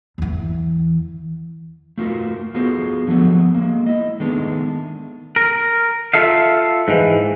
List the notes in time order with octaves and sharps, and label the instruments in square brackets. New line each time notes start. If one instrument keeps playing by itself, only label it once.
[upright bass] E2 E3
[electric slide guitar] A3 F4 F#4 A#4
B3 F4 F#4 G#4 A4 C5
D3 F3 F#3 A3 B3
G#3 A#3
E4 D#5
D#3 G#3 A3 B3 D4
[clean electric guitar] A#4
F4 A4 E5 F5
G#2 E3